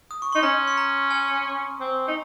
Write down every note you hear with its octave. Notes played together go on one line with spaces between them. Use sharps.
D#6
C#6
D#4 C6
C#4 A#5
C6
A#5
G#5
C4
D#4